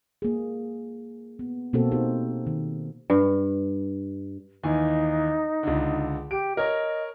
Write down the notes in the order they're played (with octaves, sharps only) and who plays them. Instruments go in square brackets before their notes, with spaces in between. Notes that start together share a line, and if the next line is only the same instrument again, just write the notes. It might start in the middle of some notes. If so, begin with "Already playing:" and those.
[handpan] A#3 G#4
B3
B2 A#3 C4 F#4 A4
D#4 G4 C5
D#3
[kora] G2
[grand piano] D#2 E3 G#5 [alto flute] D#4
[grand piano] C#2 D3
[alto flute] G4 [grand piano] D7
[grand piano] A#4 C#5 [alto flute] D#5